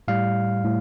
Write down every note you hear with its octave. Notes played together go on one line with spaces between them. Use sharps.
A2 G3 F5
A2